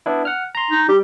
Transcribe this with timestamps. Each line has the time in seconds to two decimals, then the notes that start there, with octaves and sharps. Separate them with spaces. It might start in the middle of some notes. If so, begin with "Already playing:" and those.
0.06 B3 D4 E4
0.25 F#5 F6
0.55 A#5 C6
0.71 D#4
0.89 G3 G4